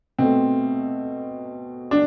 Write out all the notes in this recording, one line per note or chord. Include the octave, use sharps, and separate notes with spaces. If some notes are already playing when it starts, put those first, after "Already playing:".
B2 A3 C4
D4